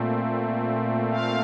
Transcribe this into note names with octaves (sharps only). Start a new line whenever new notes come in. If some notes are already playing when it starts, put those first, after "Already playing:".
Already playing: A#2 A3 C4
F5